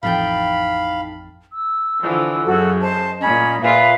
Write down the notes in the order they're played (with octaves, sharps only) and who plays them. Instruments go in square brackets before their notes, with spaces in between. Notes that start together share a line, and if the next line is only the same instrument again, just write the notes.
[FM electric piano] A1 F2 A5 [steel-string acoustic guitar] A2 D#4 G5 [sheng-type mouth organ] F5 B5
[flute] E6
[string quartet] D3 E3 F3
[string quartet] F#2 C#3 [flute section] F#4 A4
[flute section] C5 A5 [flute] D#5
[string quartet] A#2 B5 [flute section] C#4 [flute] D#5
[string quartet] A#2 F4 G#4 [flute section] B4 E5 F5